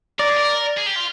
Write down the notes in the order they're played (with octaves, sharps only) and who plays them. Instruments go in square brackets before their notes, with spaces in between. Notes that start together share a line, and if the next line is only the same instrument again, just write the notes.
[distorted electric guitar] A#4 [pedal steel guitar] D5
[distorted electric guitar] G#4
A#4
G#4
G4
F4